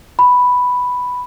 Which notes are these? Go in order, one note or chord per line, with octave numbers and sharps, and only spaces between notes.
B5